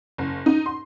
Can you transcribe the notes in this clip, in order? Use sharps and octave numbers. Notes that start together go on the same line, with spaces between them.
F#1
D#4
C6